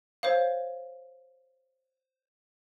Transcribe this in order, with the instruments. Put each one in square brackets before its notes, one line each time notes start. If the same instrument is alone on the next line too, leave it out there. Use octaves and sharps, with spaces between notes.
[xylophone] C5 C#5 F5